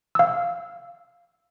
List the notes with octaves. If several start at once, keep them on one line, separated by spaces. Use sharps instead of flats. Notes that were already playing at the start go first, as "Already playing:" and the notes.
F5 E6